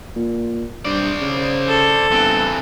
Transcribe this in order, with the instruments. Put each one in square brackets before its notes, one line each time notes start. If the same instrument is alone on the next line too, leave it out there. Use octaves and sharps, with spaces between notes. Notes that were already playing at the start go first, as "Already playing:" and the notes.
[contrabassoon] A#2
[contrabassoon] G2 [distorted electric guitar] C5 D5
[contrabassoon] C#3
[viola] A4
[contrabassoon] G1 [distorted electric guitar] E3 C4